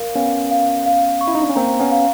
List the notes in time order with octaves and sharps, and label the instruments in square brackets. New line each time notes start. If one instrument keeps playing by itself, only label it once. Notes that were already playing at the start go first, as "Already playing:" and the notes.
Already playing: [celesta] A#4 F5
[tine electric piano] B3 C#4 [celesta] F5
[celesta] F5
F5
C#6
[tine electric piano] E4
D#4
D4
C#4
[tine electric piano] A#3 C4 [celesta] A#5
[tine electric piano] B3 C#4
[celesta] F5